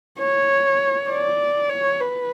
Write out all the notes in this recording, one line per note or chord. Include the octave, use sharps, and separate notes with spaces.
C#5
D5
C#5
B4